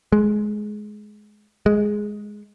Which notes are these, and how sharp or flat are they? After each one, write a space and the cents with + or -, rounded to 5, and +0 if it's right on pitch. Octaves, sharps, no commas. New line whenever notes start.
G#3 +15
G#3 +5